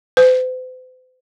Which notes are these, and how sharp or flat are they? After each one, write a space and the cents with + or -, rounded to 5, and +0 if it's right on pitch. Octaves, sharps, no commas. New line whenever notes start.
C5 -45